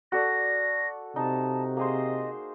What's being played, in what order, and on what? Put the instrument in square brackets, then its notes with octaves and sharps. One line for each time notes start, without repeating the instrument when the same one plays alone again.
[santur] F#4 A4 D5 [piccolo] A#6
[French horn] C3 [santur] D#4 [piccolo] A5
[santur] A#3 G#4 C5 [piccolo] D#5